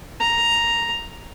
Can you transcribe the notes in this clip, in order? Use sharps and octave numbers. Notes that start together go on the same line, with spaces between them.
A#5